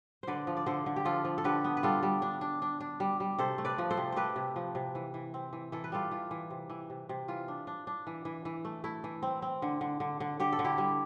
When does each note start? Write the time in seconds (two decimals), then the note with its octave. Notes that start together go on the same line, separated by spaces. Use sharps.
0.23 D3 B4 C5 D5
0.47 F3
0.57 D5
0.66 D3 A4 C5
0.86 D3
0.96 G4
1.05 F3 F4 A4
1.25 F3
1.38 A4
1.44 D3 G4 B4
1.64 B3
1.77 B4
1.83 G3 F4 A4
2.03 G3
2.22 D4
2.41 D4
2.62 D4
2.80 D4
3.00 G3
3.20 G3
3.38 C3 A4 C5
3.58 A3
3.65 B4 D5
3.78 F3
3.91 A4 C5
3.97 C3
4.12 A3 G4 B4 C5
4.36 C3
4.56 F3
4.75 C3
4.95 E3
5.14 E3
5.34 C4
5.53 E3
5.72 E3 A4
5.84 B4
5.92 G3 F4 A4
6.11 E3 F4
6.31 E3
6.50 C3
6.70 E3
6.90 C3
7.09 C3
7.28 E3 F4
7.48 D4
7.67 D4
7.87 D4
8.07 E3
8.25 E3
8.45 E3
8.65 A3
8.84 A3 E4
9.04 E3
9.22 C4
9.42 C4
9.62 D3
9.81 D3
10.00 D3
10.20 D3
10.40 D3 G4
10.52 A4
10.59 D3
10.64 E4 G4
10.78 G3